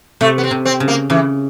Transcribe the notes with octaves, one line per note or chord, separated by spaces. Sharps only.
C3 A3
B3
C4
C3
C4
C#3
A#3
C#3 E3